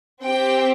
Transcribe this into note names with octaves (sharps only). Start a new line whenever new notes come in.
C4 G4 G5